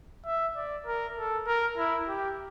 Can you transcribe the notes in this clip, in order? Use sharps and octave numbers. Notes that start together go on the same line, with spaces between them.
E5
D5
A#4
A4
A#4
E4
G4